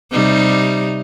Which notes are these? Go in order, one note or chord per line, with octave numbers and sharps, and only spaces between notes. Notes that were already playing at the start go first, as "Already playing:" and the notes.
C3 G3 D#4